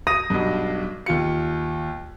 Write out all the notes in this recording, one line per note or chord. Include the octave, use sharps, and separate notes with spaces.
D#6 A#6 D#7
B1 G2
D#2 F4 C#7